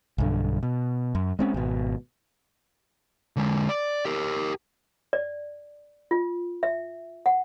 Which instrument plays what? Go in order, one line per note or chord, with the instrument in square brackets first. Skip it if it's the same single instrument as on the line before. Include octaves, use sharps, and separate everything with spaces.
[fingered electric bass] B1 G2 D3
B2
F#2
G#3 C4 C#4
G#1 B2
[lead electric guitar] D3 G#3
D5
G4 A#4
[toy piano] D5
F4
E5
F#5